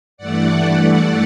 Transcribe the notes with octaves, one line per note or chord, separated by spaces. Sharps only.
G2 E3 A3 D5 F#5